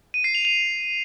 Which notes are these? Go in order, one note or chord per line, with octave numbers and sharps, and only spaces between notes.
D#7
C7
F7
F7